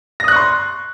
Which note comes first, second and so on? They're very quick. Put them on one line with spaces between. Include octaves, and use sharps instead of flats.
A#6 D#6 F#6 C#6 C6